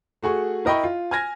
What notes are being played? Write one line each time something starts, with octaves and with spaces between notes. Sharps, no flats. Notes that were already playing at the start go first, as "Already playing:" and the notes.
A3 F#4 G#4 C#6
E4 A#4 D#5 G5 B5 C#6
F4
G#5 F6 G#6 A#6